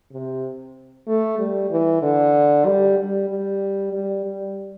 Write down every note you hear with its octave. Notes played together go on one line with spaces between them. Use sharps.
C3
A3
G3
E3
D3
G3
G3
G3
G3
G3